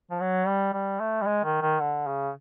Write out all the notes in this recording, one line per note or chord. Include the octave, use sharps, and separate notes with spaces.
F3
F#3
G3
G3
A3
G3
G#3
D#3
D#3
D3
C#3